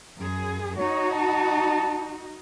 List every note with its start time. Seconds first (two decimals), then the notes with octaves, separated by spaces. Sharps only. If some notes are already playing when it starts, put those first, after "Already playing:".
0.19 F#2 G#4
0.77 D#4 F#4 C#5
1.12 A5